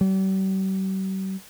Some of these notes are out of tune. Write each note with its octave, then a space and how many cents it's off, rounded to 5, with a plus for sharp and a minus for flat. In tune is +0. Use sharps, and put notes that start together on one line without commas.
G3 -45